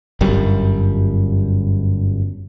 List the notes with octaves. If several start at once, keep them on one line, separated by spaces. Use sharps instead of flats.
G1 F#2 G3